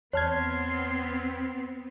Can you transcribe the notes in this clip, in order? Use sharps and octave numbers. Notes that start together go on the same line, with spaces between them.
E2 B3 C4 C#5 A5 C6 F6 G#6